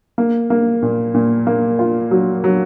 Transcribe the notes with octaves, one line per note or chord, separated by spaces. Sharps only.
A#3
A#3
A#2
A#2
A#3
F4
F#3
F#3